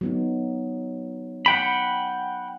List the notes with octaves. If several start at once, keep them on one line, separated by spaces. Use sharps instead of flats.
F#3 B3 D#4
F#5 G5 B5